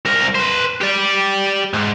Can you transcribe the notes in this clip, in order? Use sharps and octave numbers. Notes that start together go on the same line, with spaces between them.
C2 A#4
B4 C5
G4 D5
G#2